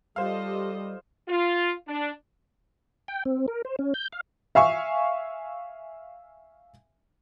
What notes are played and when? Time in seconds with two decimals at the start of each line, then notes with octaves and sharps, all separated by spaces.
0.16 G3 F4 G4 A4 C5 D#5 F5
1.29 F4
1.88 D4
3.08 G5
3.25 C4
3.48 A#4
3.65 C5
3.79 C#4
3.94 G6
4.13 F5
4.55 E5 F5 G#5 C#6